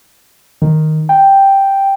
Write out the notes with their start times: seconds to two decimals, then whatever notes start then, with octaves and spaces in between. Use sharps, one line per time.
0.62 D#3
1.09 G5